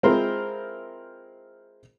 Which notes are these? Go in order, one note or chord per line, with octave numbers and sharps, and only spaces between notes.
G#3 C4 E4 F4 A#4 C5